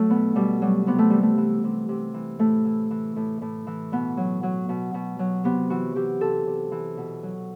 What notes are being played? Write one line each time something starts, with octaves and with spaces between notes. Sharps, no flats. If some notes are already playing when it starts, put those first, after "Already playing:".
Already playing: F#3 A3 A4
B2 B3
B2 G3
F#3 G3
C3 B3
A3
E3 G3
A3
E3
C3
C3
E3
A2 A3
E3
E3
A2
A2
E3
B2 B3
F#3
F#3
B2
B2
F#3
C3 B3
E3 F#4
E3 G4
C3 A4
C3
E3
B2
F#3